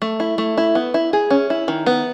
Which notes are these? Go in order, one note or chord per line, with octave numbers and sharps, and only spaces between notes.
A3
E4
A3
E4
B3
E4
G#4
C#4
E4
D#3
B3